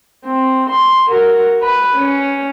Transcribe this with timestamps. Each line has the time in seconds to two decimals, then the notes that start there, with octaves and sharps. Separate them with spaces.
0.24 C4
0.70 C6
1.09 F#4 A#4
1.62 B4
1.96 C#4